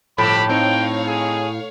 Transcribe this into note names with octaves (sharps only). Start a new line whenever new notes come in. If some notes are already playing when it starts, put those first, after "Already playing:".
G1 A2 F3 G4 B5 E6
C4 D#4 C#5 F5 G5
G#4